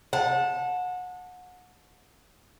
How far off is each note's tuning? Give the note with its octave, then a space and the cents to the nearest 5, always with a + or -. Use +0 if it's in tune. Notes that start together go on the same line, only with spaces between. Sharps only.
F#5 -30 A5 +0